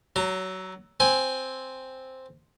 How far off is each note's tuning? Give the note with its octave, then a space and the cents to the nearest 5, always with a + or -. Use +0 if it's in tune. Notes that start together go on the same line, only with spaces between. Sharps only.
F#3 +25 A#5 -30
C4 +0 G#5 +0